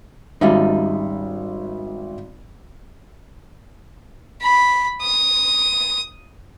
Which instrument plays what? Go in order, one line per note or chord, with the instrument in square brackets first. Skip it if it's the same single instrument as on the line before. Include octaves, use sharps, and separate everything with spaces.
[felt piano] G#1 E5 F5 [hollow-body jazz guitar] G3 C#4 D#4
[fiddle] B5
D#6